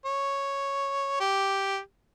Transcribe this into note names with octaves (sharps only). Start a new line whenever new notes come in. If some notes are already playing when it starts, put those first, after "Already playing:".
C#5
G4